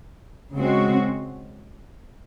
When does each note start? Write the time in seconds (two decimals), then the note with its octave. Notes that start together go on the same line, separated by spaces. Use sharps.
0.54 C#3 G#3 C4 F#4